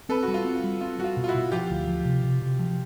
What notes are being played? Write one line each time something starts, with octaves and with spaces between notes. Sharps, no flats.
C4 A4 B4
F#4
G3
F4
C4
G3
C4 F4
G3 F#4
F4
B2
F4
E4 F#4
B2
F3 F4 G4
D2
F3
C3
C3
C3
F3